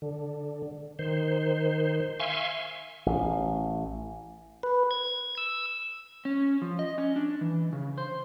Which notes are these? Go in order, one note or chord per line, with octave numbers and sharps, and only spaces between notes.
D3
D#3 C5
E5 F5 G#5 C6 C#6
A1
B4
G#6
E6
C#4
F3
D#5
C#4
D4
E3
C#3
C5